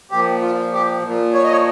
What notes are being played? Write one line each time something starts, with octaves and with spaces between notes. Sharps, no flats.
A#2 F3 G4
F4
G4
A#2 F3
C#5
D#5
C#5